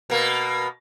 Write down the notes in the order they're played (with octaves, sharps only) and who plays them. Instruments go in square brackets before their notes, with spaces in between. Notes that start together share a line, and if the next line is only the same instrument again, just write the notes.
[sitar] B2 A#3